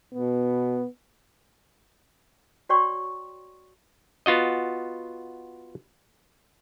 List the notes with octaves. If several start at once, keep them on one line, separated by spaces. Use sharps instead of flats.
B2 B3
F#4 C#5 D5 G5 C6 C#6
B3 F4 F#4 D#5